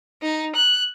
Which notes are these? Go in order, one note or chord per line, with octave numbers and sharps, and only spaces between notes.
D#4
F#6